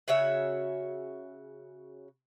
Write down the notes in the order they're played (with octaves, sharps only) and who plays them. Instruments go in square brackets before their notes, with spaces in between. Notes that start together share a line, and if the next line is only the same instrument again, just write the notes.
[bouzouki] C#3 F#4 C#5 E5